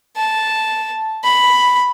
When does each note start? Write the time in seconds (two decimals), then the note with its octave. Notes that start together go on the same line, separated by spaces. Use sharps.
0.16 A5
1.24 B5